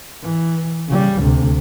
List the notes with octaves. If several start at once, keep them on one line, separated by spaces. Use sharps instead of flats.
E3
C#3 G3
D2 C3